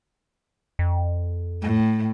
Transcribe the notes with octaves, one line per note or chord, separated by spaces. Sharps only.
F2
A2